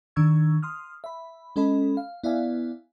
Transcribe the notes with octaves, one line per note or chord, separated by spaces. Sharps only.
D#3 D4 C#6 E6 G#6
C6 D#6 F6
E5 B5
G#3 C#4 A4 D#5 B5
F5
B3 E4 D5 E5 F5 G#5